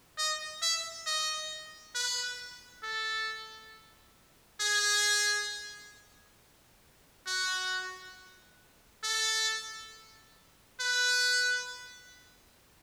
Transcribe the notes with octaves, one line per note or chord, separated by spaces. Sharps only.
D#5
E5
D#5
B4
A4
G#4
F#4
A4
B4